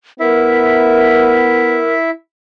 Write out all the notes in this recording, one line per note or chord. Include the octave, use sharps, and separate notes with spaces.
B3 E4 A#4 E5